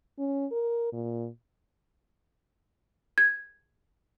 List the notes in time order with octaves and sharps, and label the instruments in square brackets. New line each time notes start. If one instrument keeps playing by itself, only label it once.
[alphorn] C#4
A#4
A#2
[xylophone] G#6